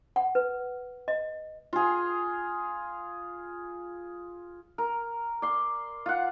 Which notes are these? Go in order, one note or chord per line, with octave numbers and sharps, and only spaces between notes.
F#5
B4
D#5
F4 G#4
A#4
D5 C6
F4 F#5